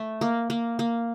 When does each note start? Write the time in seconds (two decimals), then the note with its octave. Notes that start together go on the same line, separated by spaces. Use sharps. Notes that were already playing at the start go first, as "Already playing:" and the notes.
Already playing: A3
0.21 A#3
0.50 A#3
0.79 A#3